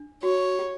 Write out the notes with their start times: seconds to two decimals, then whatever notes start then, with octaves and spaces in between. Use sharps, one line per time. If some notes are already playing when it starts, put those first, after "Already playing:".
Already playing: D4
0.23 F#4 C#5
0.59 G4